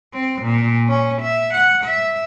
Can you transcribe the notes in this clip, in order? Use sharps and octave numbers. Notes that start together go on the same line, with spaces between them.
C4
A#2
C#4
E5
F#5
E5